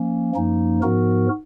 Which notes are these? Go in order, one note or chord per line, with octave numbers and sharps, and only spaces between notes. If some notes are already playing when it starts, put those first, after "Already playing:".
Already playing: F3 A#3 C#4
F#2 F3 A#3 D#4
G#2 F3 B3 F#4 A#4